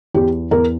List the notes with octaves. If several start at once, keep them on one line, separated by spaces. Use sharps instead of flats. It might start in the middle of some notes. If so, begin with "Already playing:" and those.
E2 G4
E2 A#4